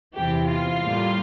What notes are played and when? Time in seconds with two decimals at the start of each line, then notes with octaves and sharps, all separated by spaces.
0.14 E2 C3 E3 G4
0.48 F4
0.82 A2 G3 A#3